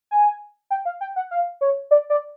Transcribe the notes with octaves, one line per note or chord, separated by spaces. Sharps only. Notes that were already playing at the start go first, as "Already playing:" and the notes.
G#5
G5
F5
G5
F#5
F5
C#5
D5
D5